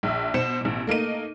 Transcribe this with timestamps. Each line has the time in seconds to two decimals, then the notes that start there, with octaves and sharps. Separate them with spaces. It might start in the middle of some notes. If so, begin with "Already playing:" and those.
0.03 A#1 E5
0.34 B2 C5 C#7 E7
0.61 A1 B2
0.87 A3 A#3 D#4 D#7